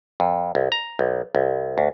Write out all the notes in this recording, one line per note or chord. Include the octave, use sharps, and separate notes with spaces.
F2
C2
A#5
B1
C2
D2